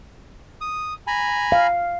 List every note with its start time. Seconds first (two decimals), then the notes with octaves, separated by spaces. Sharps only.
0.61 D#6
1.07 G#5 A#5 B5
1.52 F5